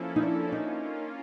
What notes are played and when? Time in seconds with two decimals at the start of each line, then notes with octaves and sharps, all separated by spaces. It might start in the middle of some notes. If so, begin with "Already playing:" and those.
Already playing: F3 A#3 C#4 E4 A4
0.16 D#4
0.23 D4
0.52 A#3 C#4 D#4 F4